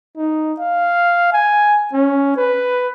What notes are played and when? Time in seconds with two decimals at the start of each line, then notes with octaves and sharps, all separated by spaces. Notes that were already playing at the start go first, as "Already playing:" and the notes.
0.17 D#4
0.60 F5
1.33 G#5
1.93 C#4
2.37 B4